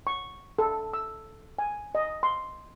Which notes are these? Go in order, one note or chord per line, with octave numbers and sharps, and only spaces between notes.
C#6
A4
E6
G#5
D#5
C6